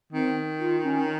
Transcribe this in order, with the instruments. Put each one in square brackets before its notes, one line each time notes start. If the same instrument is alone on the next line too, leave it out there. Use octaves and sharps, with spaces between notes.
[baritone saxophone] D#3 [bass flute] C4
[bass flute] F4
C#4